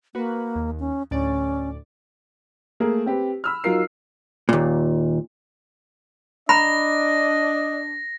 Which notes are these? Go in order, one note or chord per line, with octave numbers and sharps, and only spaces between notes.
A#3 F#4 B4
D#2
C#4
D2 A2 C#4 D5
A3 A#3 G#4 A#4
C4 G4 B4
B5 E6 F6
F#3 D#4 F4 A#4 C7
D#2 A#2
D4 D#5 A#5 B5 A#6